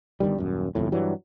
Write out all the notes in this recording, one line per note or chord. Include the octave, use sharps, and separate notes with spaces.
G1 G2 D#3 G3
D#1 F#2
G1 C2 F2 A2
G2 E3 F#3 G3